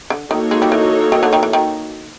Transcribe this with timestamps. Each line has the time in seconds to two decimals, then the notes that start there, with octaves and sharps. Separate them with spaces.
0.10 D3
0.31 D#3 A#3 D#4 F#4 A4 C#5
0.51 G#3
0.62 G3
0.72 E3
1.12 D#3
1.23 D3
1.33 D#3
1.43 E3
1.53 D#3